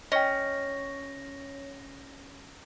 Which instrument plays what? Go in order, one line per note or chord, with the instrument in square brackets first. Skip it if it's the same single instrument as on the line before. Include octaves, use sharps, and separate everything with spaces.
[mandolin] C#4 [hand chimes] C#5 [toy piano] D#5 G5 [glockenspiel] A#6